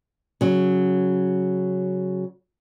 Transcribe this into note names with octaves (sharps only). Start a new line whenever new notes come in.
C#3 F#3